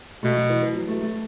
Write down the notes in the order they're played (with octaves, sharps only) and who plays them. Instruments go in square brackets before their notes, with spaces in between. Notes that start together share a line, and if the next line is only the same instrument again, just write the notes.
[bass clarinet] B2 [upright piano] A3
[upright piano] F#3
E3
E3
F#3
A3
A3